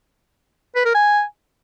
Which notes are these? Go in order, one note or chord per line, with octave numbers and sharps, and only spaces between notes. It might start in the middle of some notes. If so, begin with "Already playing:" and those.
B4
A#4
G#5